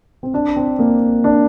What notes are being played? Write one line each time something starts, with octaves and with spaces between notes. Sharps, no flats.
C4
D4
C4
A#3
D4